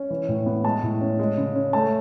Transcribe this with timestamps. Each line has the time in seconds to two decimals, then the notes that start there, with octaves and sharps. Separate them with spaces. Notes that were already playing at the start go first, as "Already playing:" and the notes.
Already playing: C#4
0.10 E3
0.28 A2
0.46 B3
0.65 G#3 A5
0.83 A2
1.01 C#4
1.19 G#3
1.37 C#3
1.55 C#4
1.73 A3 A5